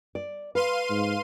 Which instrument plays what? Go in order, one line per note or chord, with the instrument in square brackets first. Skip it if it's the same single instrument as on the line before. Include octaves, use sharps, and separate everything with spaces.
[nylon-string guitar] D5
[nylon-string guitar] B4 [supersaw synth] F5 C6 D#7
[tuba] G#2